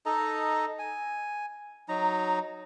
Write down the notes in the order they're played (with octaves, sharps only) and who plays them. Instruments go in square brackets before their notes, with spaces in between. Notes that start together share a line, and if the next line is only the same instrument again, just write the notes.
[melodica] D#4 A4 D#5 A#5
G#5
F#3 D#4 A#5